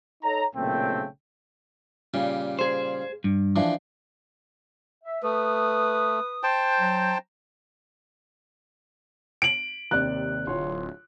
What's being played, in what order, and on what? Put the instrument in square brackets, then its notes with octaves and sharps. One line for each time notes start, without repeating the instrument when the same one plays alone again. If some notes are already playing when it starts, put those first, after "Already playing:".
[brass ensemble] D#4 A4 C#5 A#5
B1 A#2 C#3 A3 C4 G5
[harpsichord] A#2 C#3 G3
[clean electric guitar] G#4 C5
G2
[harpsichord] E3 F3 D4
[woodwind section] E5
[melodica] A3 [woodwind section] B4 D#6
[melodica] C5 G5 A5
[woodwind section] F#3 A#5
[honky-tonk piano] D7 F#7
[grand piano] D#2 C3 D5 [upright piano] F#6
[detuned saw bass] D1 [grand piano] F4 C#5 C6